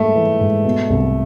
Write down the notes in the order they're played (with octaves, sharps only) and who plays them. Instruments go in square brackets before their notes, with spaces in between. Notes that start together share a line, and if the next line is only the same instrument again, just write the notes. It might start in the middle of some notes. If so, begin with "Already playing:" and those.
Already playing: [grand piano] G#2 E3 G3 A#3 [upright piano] A3
[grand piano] E3
G#2
B2
C2